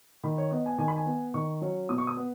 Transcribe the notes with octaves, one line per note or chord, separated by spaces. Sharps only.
D#3 B5
C#5
B3 D#5
G#5
D#3 G#5
B5
G#5
B3
D#3 C#6
F#3 C#4
B2 D#6
C#6
D#6
B3